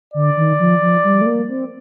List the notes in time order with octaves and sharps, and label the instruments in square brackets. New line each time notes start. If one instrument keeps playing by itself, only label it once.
[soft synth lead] D3 [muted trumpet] D5
[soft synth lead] D#3
F3
F3
G3
A3
A#3
C4